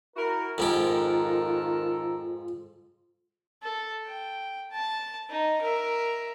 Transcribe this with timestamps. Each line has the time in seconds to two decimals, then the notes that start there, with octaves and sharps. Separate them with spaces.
0.16 E4 F#4 A#4
0.58 F2 G#2 D#3 F4 G4 A4 A#4
3.63 A4
4.06 G5
4.71 A5
5.29 D#4
5.62 A#4 E5